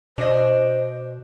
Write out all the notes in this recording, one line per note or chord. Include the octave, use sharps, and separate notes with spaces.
B2 D4 C5 D#5